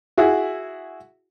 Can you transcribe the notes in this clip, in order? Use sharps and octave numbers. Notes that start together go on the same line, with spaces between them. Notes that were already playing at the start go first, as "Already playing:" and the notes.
E4 F#4 G#4